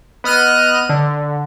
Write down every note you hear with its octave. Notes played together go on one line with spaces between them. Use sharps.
B3 D#5 F6 F#6 D#7
D3